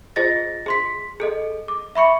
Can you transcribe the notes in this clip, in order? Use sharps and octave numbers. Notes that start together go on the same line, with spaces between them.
F4 G#4 C5 D#5 A6 A#6
G#4 C6 B6
G#4 A4 D#5
D6
E5 B5 C#6 C#7